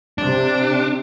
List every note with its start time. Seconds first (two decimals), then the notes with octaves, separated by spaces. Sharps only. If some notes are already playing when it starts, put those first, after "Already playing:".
0.18 C3 D4